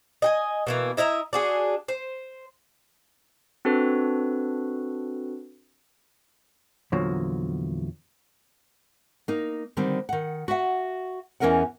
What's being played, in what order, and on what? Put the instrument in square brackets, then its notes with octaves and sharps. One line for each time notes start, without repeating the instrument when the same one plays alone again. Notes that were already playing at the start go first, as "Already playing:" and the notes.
[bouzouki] D#5 G5 G#5
B2 E3 A#3
E4 D#5 E5 A#5
D4 F#4 G#4
C5
[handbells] C4 D4 F#4 A4 B4
[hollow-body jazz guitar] E2 A#2 D3 F3 F#3
[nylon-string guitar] A#3 D#4
D3 D#3 G3 C4
D#3 F#5
F#4 E5 F#5
E2 E3 C#4 A#4 D#5 F#5